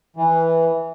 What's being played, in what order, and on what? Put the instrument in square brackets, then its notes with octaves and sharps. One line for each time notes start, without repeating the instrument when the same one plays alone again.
[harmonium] E3